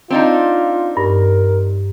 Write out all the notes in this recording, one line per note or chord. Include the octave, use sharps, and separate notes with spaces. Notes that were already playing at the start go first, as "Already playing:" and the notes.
C4 D4 D#4 F4
G2 A#4